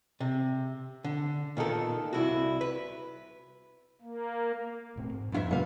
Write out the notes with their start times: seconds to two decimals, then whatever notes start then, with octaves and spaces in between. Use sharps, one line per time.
0.20 C3
1.04 D3
1.57 A#2 D#3 B3 A4
2.13 C2 E4 F#4
2.61 B4
4.02 A#3
4.96 E1 A2 C4
5.13 G#2
5.32 F2 G#2 F4 E5
5.51 G2 D3 G3 B3 F5